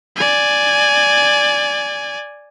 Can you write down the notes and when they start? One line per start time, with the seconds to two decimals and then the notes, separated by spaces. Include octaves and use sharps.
0.16 D5 G#5